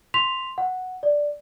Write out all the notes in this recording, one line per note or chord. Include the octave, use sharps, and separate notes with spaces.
C6 B6 F7
F#5
D5